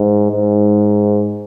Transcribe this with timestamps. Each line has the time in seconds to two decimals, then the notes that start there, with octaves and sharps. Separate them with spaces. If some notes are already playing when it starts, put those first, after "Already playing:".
Already playing: G#2
0.32 G#2